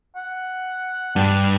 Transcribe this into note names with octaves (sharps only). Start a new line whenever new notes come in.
F#5
G2 D4